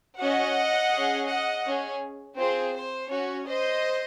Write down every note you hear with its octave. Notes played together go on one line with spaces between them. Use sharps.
C#4 F#4 D#5 F#5
C#4 G#4
D#5 F#5
C#4 G#4
C4 F4 G#4 C5
C5
C#4 F#4 C#5
C5 D#5